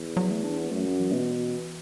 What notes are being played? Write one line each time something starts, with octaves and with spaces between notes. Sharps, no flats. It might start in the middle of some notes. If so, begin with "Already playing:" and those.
Already playing: E2
F#3
A3
D4
B3
F#2 A3
F#3
E3
B2